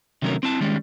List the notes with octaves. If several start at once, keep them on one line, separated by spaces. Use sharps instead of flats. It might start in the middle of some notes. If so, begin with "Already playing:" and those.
C3 D#3 F#3 A3 C#4 A#4
C4 E4 A5
D#3 G3 G#3 C#4